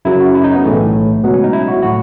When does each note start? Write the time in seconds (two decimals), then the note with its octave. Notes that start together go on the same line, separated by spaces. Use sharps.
0.05 F#2 C#3 F#3 E4
0.20 F#4
0.35 E4
0.44 D#4
0.54 B3
0.64 B1 A2 E3 A3
1.23 C#2 B2 F#3 B3
1.33 C#4
1.44 D#4
1.53 E4
1.68 F#4
1.83 A2 F#3 F#4